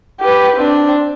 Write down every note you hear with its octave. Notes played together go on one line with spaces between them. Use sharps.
G4 B4
C4 D4